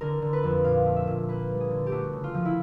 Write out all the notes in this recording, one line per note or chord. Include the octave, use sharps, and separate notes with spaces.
D3 A#4
D3
B4
F2
A#2 F5
A3
E5
A#2
A#3 B4
G3
G#4
D3
G4
A3 F#4
C#3
F4
F3
E4